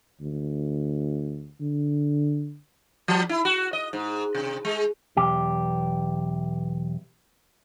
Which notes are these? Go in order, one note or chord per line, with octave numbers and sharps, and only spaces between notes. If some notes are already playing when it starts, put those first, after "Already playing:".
D2
D3
F3
E4
F#4
D#5
G#2
C3
G#3
B1 E2 G4